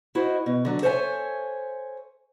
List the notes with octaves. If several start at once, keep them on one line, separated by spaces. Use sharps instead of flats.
E4 F#4 C5 D#5
B2
D3 F#3
A4 C5 C#5 E5 F5 G#5